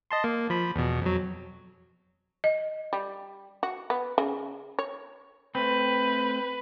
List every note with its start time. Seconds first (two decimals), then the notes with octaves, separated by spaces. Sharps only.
0.11 D#5 A5 C6
0.24 A#3
0.50 F3 B5
0.76 E2 B2
1.01 F2 F#3
2.44 D#5
2.93 G3
3.63 F#4
3.90 B3
4.18 C#3
4.79 C#5
5.55 A3 C4 B4